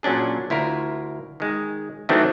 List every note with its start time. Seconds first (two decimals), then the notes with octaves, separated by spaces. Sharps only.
0.03 A#2 F#3 C#4 D4 G#4
0.50 D2 E4 F4 A#4
1.40 D#3 G#3
2.09 D#3 E3 F#3 A3 C4 D4